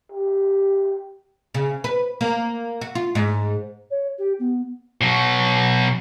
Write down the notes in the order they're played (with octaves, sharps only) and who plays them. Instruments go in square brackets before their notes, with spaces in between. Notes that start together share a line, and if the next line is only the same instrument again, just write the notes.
[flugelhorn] G4
[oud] C#3
B4
A#3
F#4
F4
G#2
[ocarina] C#5
G4
B3
[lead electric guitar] B2 F#3